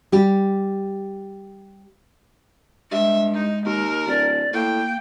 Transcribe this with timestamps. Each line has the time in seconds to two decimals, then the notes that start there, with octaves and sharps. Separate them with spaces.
0.12 G3 G4
2.92 G2 G#3 E5
3.33 D#4
3.66 D#2 A#4
4.07 D1 D5
4.53 A2 A#3 G5